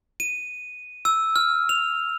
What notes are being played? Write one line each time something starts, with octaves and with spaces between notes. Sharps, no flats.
D#7
E6
F6
F7